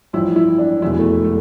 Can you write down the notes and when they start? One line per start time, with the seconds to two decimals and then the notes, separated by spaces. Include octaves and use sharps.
0.13 A1 G2 F3 E4
0.36 E4
0.59 D4
0.82 F1 E2 B2 E4
0.99 A3
1.24 A3